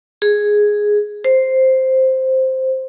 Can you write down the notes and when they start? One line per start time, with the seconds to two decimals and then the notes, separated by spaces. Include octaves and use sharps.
0.22 G#4
1.25 C5